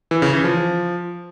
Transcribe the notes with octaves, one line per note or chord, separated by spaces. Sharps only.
E3
C#3
E3
F3